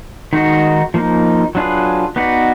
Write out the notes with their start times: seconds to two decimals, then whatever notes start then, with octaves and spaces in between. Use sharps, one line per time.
0.33 D#3 G#3 D#4 F#4
0.94 F3 A#3 D#4
1.55 F#3 D4 F4 G#4 B4
2.16 B3 D#4 F#4 B4 D5